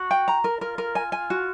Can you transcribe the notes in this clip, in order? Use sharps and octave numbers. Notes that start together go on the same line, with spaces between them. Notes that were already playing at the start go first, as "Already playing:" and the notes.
Already playing: F#4
G5
A#5
A#4
F4 A#4
A#4
G#5
G#5
F#4